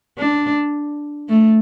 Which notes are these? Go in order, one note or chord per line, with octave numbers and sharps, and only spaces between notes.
D4
A3